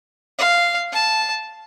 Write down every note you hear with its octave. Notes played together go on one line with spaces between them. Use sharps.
F5
A5